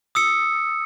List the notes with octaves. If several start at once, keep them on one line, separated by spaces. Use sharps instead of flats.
D#6 E6 C#7